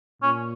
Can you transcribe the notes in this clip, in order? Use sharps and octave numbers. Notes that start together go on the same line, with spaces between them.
A#2 C#4